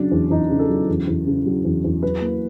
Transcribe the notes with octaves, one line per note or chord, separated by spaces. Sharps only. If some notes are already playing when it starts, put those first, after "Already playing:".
Already playing: C#3 F#3 D4
E2
E2 D#4
C#3
A4
F#3
E2
E2
C#3
F#3
E2
E2
F#3 B4
A#3